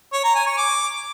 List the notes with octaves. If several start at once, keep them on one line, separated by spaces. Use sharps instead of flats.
C#5
A#5
G#5
C#6
D6